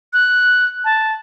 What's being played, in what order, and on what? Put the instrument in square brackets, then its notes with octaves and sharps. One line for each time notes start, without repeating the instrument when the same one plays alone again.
[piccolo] F#6
A5